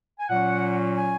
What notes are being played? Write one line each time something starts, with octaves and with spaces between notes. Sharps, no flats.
G#5
A#2 F#3 C#4 F#5
G#5